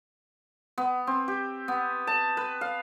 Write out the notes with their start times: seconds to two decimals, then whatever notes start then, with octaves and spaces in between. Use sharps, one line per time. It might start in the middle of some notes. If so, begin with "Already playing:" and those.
0.78 B3
1.07 C4
1.28 G4
1.68 B3
2.07 A5
2.37 B4
2.61 F5